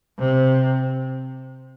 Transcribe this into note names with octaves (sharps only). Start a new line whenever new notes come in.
C3